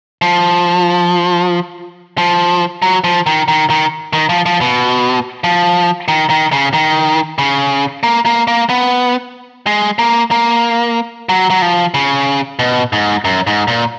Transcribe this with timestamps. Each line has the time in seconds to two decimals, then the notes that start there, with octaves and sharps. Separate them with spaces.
0.22 F3
2.18 F3
2.82 F#3
3.04 F3
3.26 D#3
3.48 D#3
3.70 D#3
4.13 D#3
4.29 F3
4.46 F3
4.61 B2
5.44 F3
6.08 D#3
6.30 D#3
6.52 C#3
6.73 D#3
7.38 C#3
8.03 A#3
8.26 A#3
8.47 A#3
8.69 B3
9.67 G#3
9.99 A#3
10.31 A#3
11.29 F#3
11.50 F#3
11.62 F3
11.94 C#3
12.59 B2
12.93 G#2
13.25 F#2
13.47 G#2
13.68 A#2